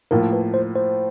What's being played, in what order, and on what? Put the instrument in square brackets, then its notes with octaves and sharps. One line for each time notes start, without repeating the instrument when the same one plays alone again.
[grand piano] A2 F3 A#3 [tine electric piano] A#4
[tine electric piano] B4
C5
C5